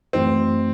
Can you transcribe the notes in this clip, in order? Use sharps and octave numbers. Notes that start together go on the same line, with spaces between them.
F#2 E3 A3 C4 D#4 F#4